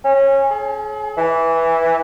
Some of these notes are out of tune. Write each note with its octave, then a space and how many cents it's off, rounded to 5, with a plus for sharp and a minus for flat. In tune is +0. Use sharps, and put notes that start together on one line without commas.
C#4 -20
G#4 +40
E3 -5